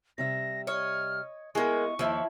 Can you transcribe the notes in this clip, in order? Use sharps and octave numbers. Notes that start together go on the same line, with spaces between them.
C3 G3 E5 A#6
C#5 D#5 F6
G#3 A#3 B3 E4 D#5 C#6
D#2 F3 E4